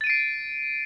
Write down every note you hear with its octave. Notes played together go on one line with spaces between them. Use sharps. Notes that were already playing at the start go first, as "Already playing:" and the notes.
A6 C7 D7 D#7